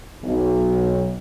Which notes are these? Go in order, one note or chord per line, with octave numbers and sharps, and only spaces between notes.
B1